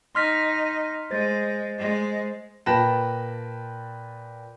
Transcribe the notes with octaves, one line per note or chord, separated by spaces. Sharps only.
D#4 C6 F6 B6
G#3 C5 A6
G#3
A#2 B4 G5 A5 A#6 E7